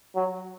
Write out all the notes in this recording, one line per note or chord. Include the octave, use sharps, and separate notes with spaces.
F#3